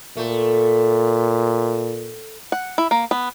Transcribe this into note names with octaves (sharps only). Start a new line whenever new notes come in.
A#2 A3
F#5
E4
A#3
B3